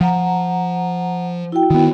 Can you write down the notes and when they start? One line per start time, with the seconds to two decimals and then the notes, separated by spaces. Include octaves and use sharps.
0.01 F3 F#5 A#5
1.52 E4 F#4 G5
1.70 D#3 B3